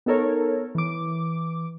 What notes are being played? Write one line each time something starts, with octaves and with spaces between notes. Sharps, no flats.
B3 D#4 A4 A#4 C#5
E3 D6